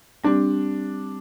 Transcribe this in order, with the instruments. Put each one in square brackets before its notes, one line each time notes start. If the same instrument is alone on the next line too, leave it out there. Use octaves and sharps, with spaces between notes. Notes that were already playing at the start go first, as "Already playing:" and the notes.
[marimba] G3 C4 G4 [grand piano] D4